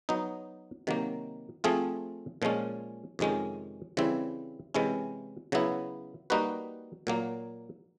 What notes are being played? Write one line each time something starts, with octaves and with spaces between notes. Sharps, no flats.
F#3 B3 D#4
C3 D#3 F#3 A#3
F3 A3 C4 F4 G#4
A#2 F3 G#3 C#4
F2 C3 D#3 G#3 C#4
C#3 E3 G3 C4 E4
C3 E3 G#3 C#4 E4
C#3 F#3 B3 E4
G3 A#3 D#4 F#4 B4
A#2 F#3 A#3